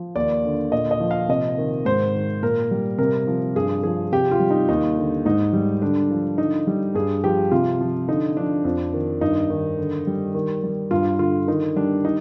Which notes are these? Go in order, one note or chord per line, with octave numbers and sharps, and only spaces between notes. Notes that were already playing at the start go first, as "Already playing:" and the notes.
Already playing: F3
D#2 D5
D3
A#2 D#5
D#5
F3
F5
C3 D#5
D#3
G#2 C5
D#3
A#2 A#4
G3
C3 A#4
F3
G2 G#4
F3 G#4
C3 G4
F4
G3
D#4
D#2 D#4
D3
G#2 D#4
G3
D3 D4
F3
D3 D#4
G3
G2 G#4
F3 G4
C3 F4
F3
D3 D#4
F3 D4
F2
D#3
G2 D#4
D#3
D3
G3
D#3
G3
G2 F4
D3 F4
D#3 D#4
G3 D4
D#4